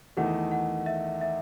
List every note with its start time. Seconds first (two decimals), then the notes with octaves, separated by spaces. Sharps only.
0.17 E2 D#3 A3 F#5
0.51 F#5
0.86 E5
1.21 E5